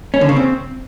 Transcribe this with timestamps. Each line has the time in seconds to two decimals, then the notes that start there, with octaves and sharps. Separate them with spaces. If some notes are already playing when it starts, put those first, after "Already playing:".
0.14 C#4
0.21 D3
0.29 C#3
0.36 C4